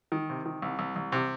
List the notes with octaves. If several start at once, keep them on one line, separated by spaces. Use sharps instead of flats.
D#3
C3
D#3
C2
C2
C2
C3